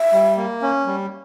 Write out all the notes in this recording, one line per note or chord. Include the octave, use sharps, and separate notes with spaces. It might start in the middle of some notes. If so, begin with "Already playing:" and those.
Already playing: E5
G3
A#3
C#4
G3